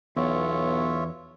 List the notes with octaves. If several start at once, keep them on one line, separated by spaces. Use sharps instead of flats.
B1 E2 F4 C#5 E5